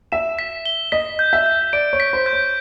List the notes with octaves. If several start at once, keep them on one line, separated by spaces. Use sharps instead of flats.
E5 E7
B6
G7
D#5 B6
G6
E5
G6
D5 D7
C#5
B6
C5
G6
C#5